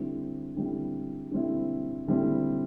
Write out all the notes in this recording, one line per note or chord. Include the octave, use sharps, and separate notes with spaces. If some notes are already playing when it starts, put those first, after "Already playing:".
Already playing: D3 G3 C4 E4
D3 G3 C4 E4
D3 G3 C4 E4
D3 G3 C4 E4